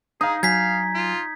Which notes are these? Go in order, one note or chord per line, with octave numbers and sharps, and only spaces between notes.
D#4 G#4 F5 D#6
F#3 F5 G#5 G#6 B6
F4